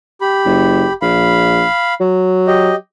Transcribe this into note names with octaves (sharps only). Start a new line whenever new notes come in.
G4 B5
F#1
A#1 F5 B5
F#3
G4 D#5